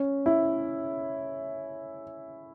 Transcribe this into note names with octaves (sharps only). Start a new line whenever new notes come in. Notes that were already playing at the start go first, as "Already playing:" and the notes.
Already playing: C#4
E4